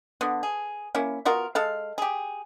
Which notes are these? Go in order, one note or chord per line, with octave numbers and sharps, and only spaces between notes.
D3 B3
G#4
A#3 C#4 E4
B3 F4 F#4 A#4
G#3 A4 F5
G4 G#4